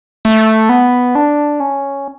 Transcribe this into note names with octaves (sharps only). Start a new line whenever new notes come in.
A3
B3
D4
C#4